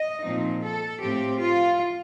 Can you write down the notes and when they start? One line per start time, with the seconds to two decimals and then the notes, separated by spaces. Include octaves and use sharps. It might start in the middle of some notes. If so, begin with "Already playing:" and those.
Already playing: D#5
0.24 A#2 F3 C4 D#4
0.62 A4
1.00 A2 F3 C4 G4
1.40 F4